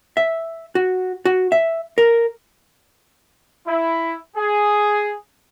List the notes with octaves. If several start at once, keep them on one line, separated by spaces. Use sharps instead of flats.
E5
F#4
F#4
E5
A#4
E4
G#4